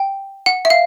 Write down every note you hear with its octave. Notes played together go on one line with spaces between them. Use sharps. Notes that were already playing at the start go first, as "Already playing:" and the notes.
Already playing: G5
F#5
E5
F5